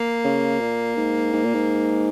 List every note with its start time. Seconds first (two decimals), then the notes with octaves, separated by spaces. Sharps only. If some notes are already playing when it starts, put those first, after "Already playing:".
Already playing: A#3
0.24 C#3
0.60 A#2
0.97 G#2
1.33 G#2
1.44 A#2
1.54 G#2